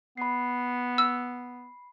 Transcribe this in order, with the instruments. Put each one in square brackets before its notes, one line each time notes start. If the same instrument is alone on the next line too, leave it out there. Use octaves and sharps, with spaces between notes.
[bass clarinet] B3 [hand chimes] B5 C7
[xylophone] E6